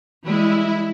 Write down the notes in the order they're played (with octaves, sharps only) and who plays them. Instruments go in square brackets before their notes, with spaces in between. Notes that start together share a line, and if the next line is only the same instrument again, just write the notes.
[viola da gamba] E3 G3 G#3 [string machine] E4